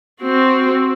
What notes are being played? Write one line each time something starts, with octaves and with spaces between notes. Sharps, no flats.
C4 F#4